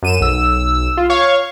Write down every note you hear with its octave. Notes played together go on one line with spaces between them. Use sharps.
F#2 D#7 E7
B1 E6
F4
C#5 F5 C#6